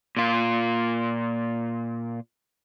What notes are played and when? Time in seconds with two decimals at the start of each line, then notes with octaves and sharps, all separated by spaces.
0.17 A#2 F4